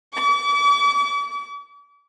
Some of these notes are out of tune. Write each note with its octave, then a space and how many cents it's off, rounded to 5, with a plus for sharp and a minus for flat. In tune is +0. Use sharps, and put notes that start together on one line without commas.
D6 -40